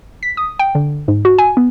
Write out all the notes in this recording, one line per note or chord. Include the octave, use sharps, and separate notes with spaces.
B6
D#6
G5
D3
G#2
F#4
G#5
B3